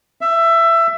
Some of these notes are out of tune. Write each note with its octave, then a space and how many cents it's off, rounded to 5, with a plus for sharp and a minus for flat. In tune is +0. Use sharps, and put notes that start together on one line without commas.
E5 +20